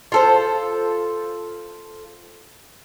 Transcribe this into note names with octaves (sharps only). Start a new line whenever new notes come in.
F4 A4 C5